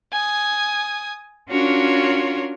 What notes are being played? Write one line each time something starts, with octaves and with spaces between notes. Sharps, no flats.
G#5 D#6
C#4 D4 F4 F#4 A#4 C#5